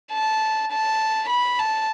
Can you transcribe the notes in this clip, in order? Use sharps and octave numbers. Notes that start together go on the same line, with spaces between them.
A5
A5
B5
A5